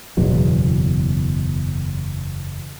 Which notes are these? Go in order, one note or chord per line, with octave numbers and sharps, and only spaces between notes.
F#1 E2 B2 F#3